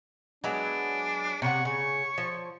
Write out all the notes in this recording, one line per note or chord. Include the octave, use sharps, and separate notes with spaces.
F#3 G#3 B3 D4
C3 A#4 C#5 F#5
C#3 C#5
F3